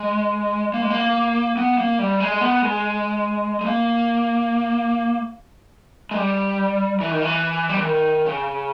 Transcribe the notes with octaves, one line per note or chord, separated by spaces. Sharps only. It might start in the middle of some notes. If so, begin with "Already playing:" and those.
Already playing: G#3
A#3
G#3
A#3
B3
A#3
G3
G#3
B3
G#3
G#3
A#3
G#3
G3
E3
D#3
E3
G3
E3
D#3
C#3